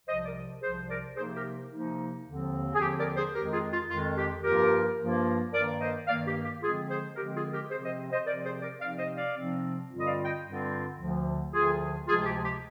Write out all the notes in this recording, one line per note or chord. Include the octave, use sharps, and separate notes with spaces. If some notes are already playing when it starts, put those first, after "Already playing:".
C2 C3 F3 C5 D#5
A#4 D5
C2 C3 F3 G#4 C5
A#4 D5
C3 F3 A#3 D#4 G#4 C5
G4 A#4
C3 F3 A#3 D#4
D#2 D3 F3 C4
G#4
D#2 D3 F3 C4 G4
A#4 D5
G#4 C5
F2 D#3 G#3 G4 A#4
F4 G#4
F4
F2 D#3 G#3 F4
G4
G2 F3 A#3 F4 G4 A#4
G2 F3 A#3 F4
G2 D#3 A#3 A#4 D5
C5 D#5
G2 D#3 A#3 D5 F5
G4
G4
D3 F3 G#3 C4 F4 G#4
G#4 C5
D3 F3 G#3 C4 G4 A#4
F4 G#4
G4 A#4
C3 F3 C4 G#4 C5
C5 D#5
C5 D#5
C3 F3 C4 A#4 D5
G#4 C5
A#4 D5
C3 F3 C4 D#4 D5 F5
C5 D#5
D5 F5
C3 F3 C4 D#4
G2 D3 G3 C4 F4
D#5
D5 F5
D#5 G5
G2 D3 G3 C4 F4
D2 D3 F3
D2 D3 F3 F4 G#4
D2 C3 F3 G#3 F4 G#4
F4
G4
G4